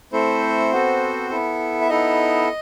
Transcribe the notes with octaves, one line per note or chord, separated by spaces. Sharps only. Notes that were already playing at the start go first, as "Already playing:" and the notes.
A3 C4 E4 A4 C5
B3 F#4 A4
B3 E4 A4
E5
B3 D#4 E4 A4 D#5